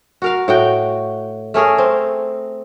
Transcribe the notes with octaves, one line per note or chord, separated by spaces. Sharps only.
F#4 A#4 F5
A2 F#4 G5
A3 C#4 G#4 A#4
C4